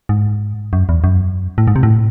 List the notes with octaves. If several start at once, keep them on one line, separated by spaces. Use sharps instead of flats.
G#2
F#2
E2
F#2
A2
G#2
C3
A2